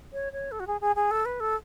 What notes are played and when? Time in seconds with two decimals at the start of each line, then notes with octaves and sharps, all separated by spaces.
0.13 C#5
0.33 C#5
0.52 A4
0.60 F#4
0.67 G#4
0.81 G#4
0.96 G#4
1.11 A4
1.25 B4
1.40 A4